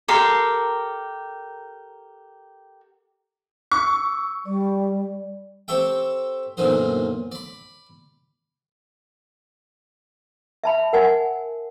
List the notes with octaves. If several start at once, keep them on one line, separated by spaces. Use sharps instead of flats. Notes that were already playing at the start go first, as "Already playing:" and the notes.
G4 A4 A#4 C6
C#6 D6 E6
G3 D5
C4 G4 A4 C#5 E5 G5
B1 F#2 A#2 D3 D#4 C5
D5 B5
E5 A5 B5
A#4 F#5 G#5